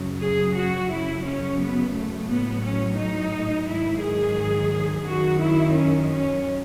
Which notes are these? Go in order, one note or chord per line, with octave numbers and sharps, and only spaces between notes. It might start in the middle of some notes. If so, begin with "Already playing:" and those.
Already playing: F#2 C#3 F#3
G#4
F#4
F#2 C#3 F#3 E4
C#4
B3
A3
A2 F#3 B3
C#4
D#4
G#2 D#3 F#3 E4
G#4
F#2 D#3 F#3 F#4
E4
C#4
C#4